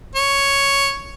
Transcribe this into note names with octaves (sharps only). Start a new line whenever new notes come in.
C#5